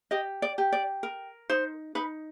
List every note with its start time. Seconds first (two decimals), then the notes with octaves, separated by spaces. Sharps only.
0.11 G4 D#5
0.42 D5
0.58 G4
0.72 D5
1.03 A#4
1.50 D#4 C5
1.95 D#4 B4